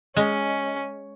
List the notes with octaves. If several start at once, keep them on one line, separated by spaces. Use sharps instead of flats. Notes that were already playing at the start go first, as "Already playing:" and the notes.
G#3 C#4